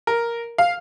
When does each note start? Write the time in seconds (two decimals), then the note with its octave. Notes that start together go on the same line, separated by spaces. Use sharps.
0.07 A#4
0.58 F5